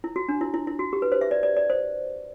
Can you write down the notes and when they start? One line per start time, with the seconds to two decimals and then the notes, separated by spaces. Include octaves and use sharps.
0.04 E4
0.16 F#4
0.29 D4
0.41 E4
0.54 E4
0.67 E4
0.79 F#4
0.93 G4
1.02 B4
1.12 C5
1.21 E5
1.31 D5
1.43 D5
1.56 D5
1.70 C5